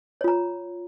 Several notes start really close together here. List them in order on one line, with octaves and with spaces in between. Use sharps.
C#5 F4 A#5